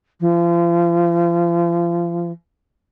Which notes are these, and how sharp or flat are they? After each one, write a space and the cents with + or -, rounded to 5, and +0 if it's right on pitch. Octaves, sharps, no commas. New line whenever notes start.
F3 -35